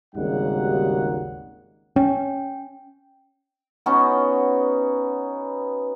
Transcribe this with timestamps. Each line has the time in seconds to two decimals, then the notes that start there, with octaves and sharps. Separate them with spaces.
0.15 G#1 D#2 C#3 G3 D#4 F#5
1.96 C#4 G5
3.86 B3 C#4 D#4 F#4